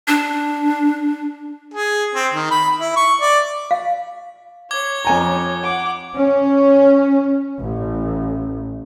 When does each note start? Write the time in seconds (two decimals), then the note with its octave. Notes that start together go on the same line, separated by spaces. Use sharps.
0.08 D4
1.74 G#4
2.15 C4
2.33 D#3
2.51 B5
2.80 E4
2.96 C#6
3.21 D5
3.71 F5
4.71 C#5 D6 G#6 G7
5.05 F2 G#5 A#5
5.63 F#5 D6
6.14 C#4
7.59 A1